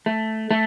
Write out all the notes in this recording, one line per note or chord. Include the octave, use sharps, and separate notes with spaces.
A3
A3